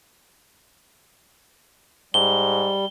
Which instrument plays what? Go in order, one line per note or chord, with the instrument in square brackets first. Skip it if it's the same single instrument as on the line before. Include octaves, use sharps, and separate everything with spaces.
[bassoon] G#2 [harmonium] G3 [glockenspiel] G7